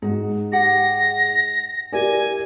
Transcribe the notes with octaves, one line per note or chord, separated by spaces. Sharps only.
G#2 D#4 F#4
G4 F#5 G5 A#6
E4 G4 A#4 D5 G#5